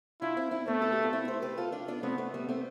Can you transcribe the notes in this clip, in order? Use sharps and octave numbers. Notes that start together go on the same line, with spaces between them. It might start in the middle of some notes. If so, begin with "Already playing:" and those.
D4 E4 F4
C4 E4
C4 E4
A3 B3 D4
A4
G4
F4
C4 E4
A4 C5
G4 B4
F4 A4
D4 F4
B3 D4
A3 B3 C4
A3
G3 B3
A3 C4